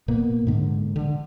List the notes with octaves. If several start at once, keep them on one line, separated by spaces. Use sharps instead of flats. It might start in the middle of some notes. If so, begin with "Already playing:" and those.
A#2 A#3 B3
G#2 D3
D3